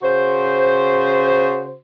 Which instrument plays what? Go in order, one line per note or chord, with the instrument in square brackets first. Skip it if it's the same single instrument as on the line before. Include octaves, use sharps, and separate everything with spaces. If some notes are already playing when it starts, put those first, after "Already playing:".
[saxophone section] C#3 F#4 C5